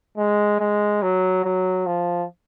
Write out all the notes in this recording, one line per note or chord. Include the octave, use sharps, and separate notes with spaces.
G#3
G#3
F#3
F#3
F3